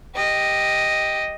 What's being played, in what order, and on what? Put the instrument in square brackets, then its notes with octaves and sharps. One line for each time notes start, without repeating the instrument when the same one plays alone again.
[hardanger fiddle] G4 D#5